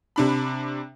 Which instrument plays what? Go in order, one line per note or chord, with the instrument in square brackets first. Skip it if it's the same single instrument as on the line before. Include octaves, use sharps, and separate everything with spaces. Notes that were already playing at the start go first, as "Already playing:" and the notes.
[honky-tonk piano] C3 D4 B5